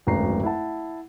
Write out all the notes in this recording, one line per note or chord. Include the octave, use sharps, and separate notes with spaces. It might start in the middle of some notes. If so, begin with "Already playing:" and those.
D1 G#1 F#2 B4 A#5 C7
E4 F#5 A5